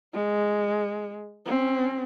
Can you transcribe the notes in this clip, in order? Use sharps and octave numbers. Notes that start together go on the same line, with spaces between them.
G#3
C4 C#4